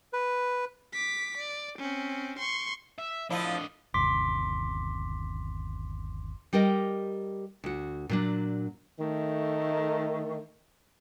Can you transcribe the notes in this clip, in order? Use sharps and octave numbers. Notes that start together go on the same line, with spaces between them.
B4
D6 B6
D5
C4 C#4
C6 C#6
E5
D3 F3 D4 E4 D#5
G1 D#2 C3 C6 D6 B6
G3 G4 A#4 D#5
D2 F#4
A#2 F#3 D4
D#3 A3